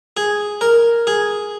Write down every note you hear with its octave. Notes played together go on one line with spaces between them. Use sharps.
G#4
A#4
G#4